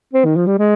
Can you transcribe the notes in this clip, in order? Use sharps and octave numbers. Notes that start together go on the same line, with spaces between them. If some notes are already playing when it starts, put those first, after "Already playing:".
C4
D#3
F3
G3
G#3